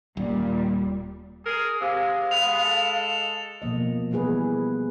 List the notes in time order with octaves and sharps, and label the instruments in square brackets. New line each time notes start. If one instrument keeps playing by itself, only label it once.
[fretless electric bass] D#1 [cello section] A#2 G3
[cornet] G#4 [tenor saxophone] A#4
[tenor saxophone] C3 [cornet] G#3 [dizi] F5
[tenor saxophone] G#3 [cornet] B3 [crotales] F7
[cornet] A4
[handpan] B2 F3 A#3 D#5
E3 G3 B3 G#4 B4